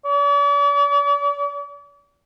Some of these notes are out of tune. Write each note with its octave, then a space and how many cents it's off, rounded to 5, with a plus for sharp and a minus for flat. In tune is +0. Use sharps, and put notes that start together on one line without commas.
D5 -45